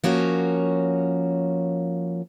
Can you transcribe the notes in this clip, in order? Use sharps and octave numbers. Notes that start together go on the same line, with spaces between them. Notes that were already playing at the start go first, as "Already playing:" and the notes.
F3 A#3 C#4 F#4 C#5